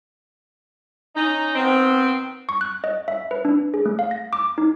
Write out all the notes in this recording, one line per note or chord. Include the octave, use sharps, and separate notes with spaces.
C#4 D#4
D#3 B3 C4
C#6
F#6
D#5
E5
B4
D4
G#4
A3
F5
A#6
D6
D#4